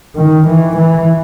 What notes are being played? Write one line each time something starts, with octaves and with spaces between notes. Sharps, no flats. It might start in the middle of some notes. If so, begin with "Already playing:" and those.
D#3
E3
E3